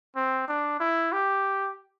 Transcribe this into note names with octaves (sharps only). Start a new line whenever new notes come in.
C4
D4
E4
G4